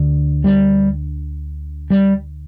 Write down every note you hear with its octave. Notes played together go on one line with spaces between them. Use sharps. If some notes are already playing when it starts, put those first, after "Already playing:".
Already playing: D2 D3
G3
G3